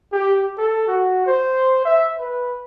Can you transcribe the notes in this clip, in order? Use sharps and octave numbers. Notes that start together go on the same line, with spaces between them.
G4
A4
F#4
C5
E5
B4